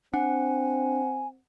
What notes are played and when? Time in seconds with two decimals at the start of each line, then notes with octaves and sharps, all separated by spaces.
0.14 C4 D4 F#5 G#5